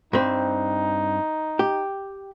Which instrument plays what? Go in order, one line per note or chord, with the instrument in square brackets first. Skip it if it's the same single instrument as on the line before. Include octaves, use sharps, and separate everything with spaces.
[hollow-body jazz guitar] G2 C4 [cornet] D#4
[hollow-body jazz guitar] G4